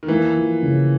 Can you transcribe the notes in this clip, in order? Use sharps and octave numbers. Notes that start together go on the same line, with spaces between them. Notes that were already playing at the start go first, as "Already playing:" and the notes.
D#3
E3 A#3
F3
C#3